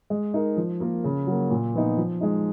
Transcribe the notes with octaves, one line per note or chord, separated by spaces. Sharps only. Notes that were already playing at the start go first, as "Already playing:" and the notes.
G#3
D#4 A#4
F3
A#3 F4 A#4
C#3
F#3 A#3
A#2
F3 B3 D#4
F3
G#3 D#4